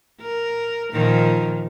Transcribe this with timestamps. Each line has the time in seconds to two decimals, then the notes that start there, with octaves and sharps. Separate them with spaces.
0.21 A#4
0.92 A#2 D#3 F3